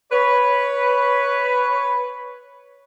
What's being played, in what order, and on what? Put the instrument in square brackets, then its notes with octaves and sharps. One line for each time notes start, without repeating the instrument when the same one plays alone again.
[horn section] B4 C#5